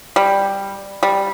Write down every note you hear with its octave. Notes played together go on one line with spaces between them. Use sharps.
G3
G3